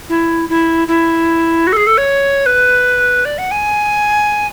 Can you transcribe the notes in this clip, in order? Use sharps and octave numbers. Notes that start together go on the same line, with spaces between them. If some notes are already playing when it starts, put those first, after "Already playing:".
E4
E4
E4
F#4
A4
G#4
A4
C#5
B4
D5
F#5
G#5